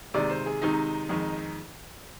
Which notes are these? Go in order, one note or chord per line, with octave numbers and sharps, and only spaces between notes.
C3 D#3 G#3 D5
C5
G#4
C3 D#3 G#3 D#4
F2 D#3 G#3